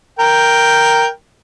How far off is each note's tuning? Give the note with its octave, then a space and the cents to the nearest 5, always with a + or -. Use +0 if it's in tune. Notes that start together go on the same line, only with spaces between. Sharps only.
A#4 +0 G5 +0